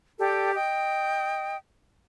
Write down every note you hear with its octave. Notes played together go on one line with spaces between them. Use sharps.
G4 A4 D5 G5
D#5 G5 D#6